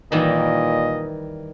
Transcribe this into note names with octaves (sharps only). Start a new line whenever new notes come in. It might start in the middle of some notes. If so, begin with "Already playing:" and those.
A#2 D#3 E3 G3 D#5